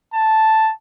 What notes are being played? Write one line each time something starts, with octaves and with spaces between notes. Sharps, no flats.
A5